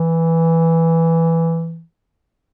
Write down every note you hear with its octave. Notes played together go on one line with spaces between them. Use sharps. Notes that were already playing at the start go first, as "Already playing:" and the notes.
Already playing: E3